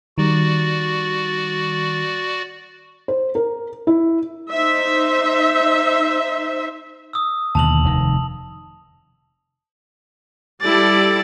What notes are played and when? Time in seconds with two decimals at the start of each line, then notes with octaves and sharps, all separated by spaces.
0.18 D#3 G3 F#4 D5
3.08 C5
3.35 A#4
3.87 E4
4.51 D#4 C5 E5
7.13 D#6 E6
7.55 D#2 B2 D3 A5 F7 F#7
7.85 F1 D#3
10.62 G3 E4 A4 D5 A6